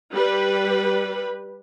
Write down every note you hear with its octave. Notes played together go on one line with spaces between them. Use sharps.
G3 B4